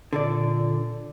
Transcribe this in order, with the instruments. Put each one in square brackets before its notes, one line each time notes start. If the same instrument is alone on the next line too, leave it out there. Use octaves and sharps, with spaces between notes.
[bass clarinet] A#2 [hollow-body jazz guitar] D3 A4 D5